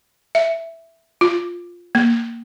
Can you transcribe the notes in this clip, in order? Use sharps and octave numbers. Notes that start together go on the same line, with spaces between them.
E5
F4
A#3